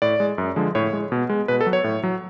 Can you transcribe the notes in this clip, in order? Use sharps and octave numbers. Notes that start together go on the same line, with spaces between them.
A2 D5
G#3
F#2
D3 F3 G#3
A2 C#5
G#3
B2
G#3
B2 B4
A4
F#3
C#5
A2
F#3